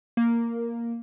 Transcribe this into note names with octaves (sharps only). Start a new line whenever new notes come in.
A#3